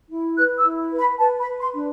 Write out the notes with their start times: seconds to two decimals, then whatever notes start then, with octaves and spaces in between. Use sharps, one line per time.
0.09 E4
0.37 B4 F#6
0.58 E6
0.64 E4
0.92 B4
0.98 B5
1.19 B4 A5
1.40 B5
1.47 B4
1.60 C6
1.74 D4